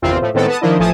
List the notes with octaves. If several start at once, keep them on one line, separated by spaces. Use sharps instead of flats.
G1 E2 C3 D#3 C4 F4
A2 F3 A3
A2 D#3 G#3 B3 C4 A4
B3 A5 D#6
D#3 F3 A#3 D4 E4 D#5
A1 F3 A3 G#5 A5 D#6